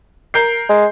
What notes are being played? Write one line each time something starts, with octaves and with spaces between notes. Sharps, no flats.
A#4 G6 C7
G#3